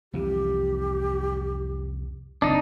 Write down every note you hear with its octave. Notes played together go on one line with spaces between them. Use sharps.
C2 F2 E3 G4
F#1 D2 C4 D4 D#4